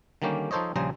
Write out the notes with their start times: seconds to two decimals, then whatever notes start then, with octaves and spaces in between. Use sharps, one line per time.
0.22 D3 D#3 G3 A#3 C#4 G4
0.51 F3 D#4 A4 C5 C#5 D#5
0.76 A#1 C#3 G3 G#4 C5 A#5